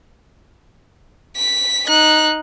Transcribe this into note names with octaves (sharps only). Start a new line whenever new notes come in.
B6
D#4 F#6